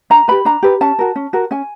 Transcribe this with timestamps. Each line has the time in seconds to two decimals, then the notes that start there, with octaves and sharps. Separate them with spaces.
0.10 D4 A#5
0.28 G4 B4 B5
0.45 D4 A#5
0.63 G4 B4
0.81 C#4 A5
0.99 F#4 A#4
1.16 C#4
1.33 F#4 A#4
1.51 C#4 G#5